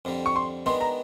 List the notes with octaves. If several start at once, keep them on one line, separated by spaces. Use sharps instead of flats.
F2 D3 G3
C#6
C6
D#3 G#3 B3 D4 C6
A#5